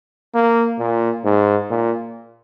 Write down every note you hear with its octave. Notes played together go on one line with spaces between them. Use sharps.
A#3
A#2
G#2
A#2